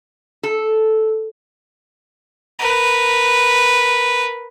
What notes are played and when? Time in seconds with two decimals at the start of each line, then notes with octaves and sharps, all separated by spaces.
0.43 A4
2.59 A#4 B4